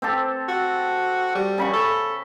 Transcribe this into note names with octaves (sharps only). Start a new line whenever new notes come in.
C4 G4 A4
F#4
G3
C#3 B5 C#6
A4